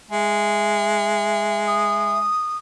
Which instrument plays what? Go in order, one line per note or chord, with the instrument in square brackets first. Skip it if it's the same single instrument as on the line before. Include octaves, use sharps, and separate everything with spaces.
[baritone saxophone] G#3 [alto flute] E5
[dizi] D#6